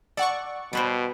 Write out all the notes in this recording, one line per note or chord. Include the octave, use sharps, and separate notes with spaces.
A4 D5 F#5 C#6
B2 G3 B4 C5